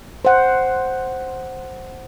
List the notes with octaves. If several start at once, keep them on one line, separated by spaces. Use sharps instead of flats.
C5 F#5